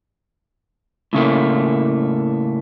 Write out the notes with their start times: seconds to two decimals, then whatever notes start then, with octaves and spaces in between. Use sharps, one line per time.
1.13 A2 C#3 A3 A#3